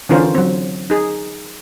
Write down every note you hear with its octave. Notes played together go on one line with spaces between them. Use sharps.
D3 E3 C#4 F4 A#4 C5
F#3 C4
D#4 G#4